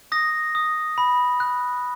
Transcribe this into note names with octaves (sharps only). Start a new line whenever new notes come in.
D#6 A#6
D#6
B5
F#6